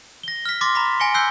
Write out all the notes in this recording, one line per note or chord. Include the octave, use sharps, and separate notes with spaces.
A#6 G7
F6 B6
C6 D6 A6 A#6
A#5 B5 B6
G#5 A#6 C#7 G7
E6 F#6 G6 C7 G7